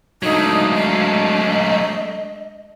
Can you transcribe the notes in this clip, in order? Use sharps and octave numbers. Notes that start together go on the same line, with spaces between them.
F#3 G#3 A3 D4 D#4 F5
D#5